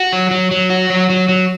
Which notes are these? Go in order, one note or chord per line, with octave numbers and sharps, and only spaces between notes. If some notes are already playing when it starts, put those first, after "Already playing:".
Already playing: F#4
F#3
F#3
F#3
F#4
F#3
F#3
F#3